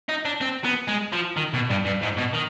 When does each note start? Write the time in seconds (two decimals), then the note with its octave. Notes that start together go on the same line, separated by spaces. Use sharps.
0.09 D#4
0.25 D4
0.41 C4
0.65 B3
0.88 G#3
1.13 F3
1.37 D#3
1.53 B2
1.69 G2
1.85 G2
2.02 G#2
2.17 B2
2.33 D#3